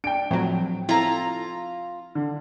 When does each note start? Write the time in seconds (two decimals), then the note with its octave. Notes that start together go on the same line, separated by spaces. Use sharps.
0.04 D4 G5 D7
0.31 A2 F3 F#3 C4
0.89 C4 E4 F4 A4 A#5
2.15 D3